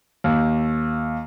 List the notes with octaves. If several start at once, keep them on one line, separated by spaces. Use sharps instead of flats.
D#2